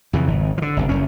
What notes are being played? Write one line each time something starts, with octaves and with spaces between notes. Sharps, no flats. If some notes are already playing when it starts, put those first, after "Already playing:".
F2 C#3 E3
G#1
D3 F3
G1 C2
F#1 F#2 C#4